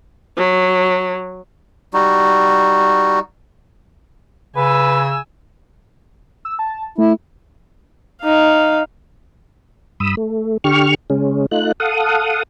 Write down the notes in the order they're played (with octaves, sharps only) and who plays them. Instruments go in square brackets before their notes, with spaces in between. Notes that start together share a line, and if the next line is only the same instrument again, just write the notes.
[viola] F#3
[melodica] G3 D#4 F#4
[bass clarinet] C#3 [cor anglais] B4 [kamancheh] G#5 E6
[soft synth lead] E6
A5
[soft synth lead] A3 [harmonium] E4
[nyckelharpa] D#4 F5
[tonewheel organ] G2 B5 D#6 E6
A3
D3 G4 C#6 F6
C#3 G#3 C#4
A3 D#4 F4 F#6
A4 F5 F#5 D#6